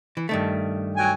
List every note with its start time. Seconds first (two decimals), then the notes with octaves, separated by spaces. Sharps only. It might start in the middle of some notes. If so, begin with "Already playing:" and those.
0.17 E3
0.29 G2 D#3 A3
0.97 F#3 G5 G#5